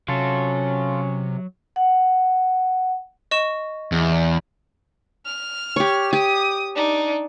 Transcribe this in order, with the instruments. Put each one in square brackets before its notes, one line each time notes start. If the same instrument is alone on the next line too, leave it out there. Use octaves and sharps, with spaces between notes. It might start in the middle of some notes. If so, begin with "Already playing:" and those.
[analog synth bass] C3 [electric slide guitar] F#3 [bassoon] C#4 [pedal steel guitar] F4 A4
[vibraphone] F#5
[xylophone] D#5 C#6 E7
[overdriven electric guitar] E2
[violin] F6
[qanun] G4 C#5
[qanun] G4 [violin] D#6
[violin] D4 D#4